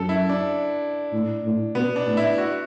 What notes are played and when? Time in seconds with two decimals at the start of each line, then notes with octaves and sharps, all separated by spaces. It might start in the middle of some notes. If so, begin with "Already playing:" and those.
Already playing: F#2 A4
0.09 E4
0.29 D4
1.13 A2
1.44 A2
1.75 B2 B3
1.96 D4
2.07 A2
2.17 E4
2.38 F#4